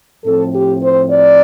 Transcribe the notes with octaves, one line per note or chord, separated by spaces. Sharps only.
A2 F3 C4 A4
G4
C5
D5